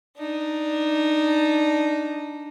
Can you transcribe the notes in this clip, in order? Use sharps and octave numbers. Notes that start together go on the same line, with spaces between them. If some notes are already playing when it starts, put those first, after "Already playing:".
D4 D#4